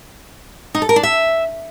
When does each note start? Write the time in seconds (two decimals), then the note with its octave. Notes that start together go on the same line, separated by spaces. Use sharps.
0.75 D#4
0.82 A4
0.89 A#4
0.96 D4
1.03 E5